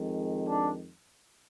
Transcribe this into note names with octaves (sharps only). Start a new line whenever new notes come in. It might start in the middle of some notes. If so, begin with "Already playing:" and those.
Already playing: F2 D#3 G#3
D4